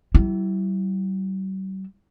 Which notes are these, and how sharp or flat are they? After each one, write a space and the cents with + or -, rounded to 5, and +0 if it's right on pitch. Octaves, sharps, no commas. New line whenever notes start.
G3 -45 E4 +0